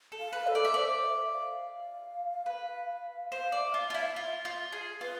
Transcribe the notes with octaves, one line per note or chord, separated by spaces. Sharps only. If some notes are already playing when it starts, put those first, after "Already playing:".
A4
F5
B4
A4
D5
E5
C5 D5
E5
F5
B4
C5 F5
D5
E5
F4
F4 E5
E4 F5
E5
F4
F4
G#4
F4 B4